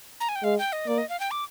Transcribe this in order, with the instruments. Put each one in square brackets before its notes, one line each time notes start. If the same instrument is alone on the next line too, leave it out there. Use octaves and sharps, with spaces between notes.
[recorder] A#5
G#5
G5
[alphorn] G#3 [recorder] F5
[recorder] G5
D#5
[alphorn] A#3 [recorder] D5
[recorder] D#5
F5
G5
D6